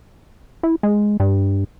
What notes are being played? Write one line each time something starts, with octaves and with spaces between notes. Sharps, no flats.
E4
G#3
G2